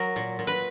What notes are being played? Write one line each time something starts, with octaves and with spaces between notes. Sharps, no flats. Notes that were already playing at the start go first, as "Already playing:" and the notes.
Already playing: F#3 A#4
A#2
A#2
B4